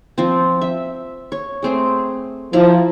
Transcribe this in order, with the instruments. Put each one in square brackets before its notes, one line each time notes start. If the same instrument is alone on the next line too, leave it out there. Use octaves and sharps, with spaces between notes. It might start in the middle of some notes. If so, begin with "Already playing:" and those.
[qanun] F3 C4
E5
C#5
A3 C4 G#4
[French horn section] F3 [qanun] E4 A5 A#5